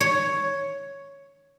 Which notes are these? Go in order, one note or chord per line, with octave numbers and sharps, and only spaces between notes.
C#5